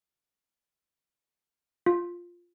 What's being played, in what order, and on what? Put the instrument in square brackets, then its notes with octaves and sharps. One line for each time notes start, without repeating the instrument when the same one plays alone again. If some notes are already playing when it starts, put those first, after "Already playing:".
[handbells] F4